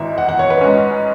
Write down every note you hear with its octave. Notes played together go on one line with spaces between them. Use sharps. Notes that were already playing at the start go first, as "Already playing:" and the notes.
Already playing: G#1 G#2 E3 E5
F#5
F#5
C#5
B4
G#2 G#3 C#4